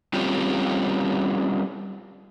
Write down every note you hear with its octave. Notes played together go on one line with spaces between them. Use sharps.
G3 C4 C#4 F4 G4